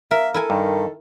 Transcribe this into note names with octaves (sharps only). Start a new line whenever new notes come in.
A#3 A#4 E5
E4 A4 A#4 G#5
G2 D#3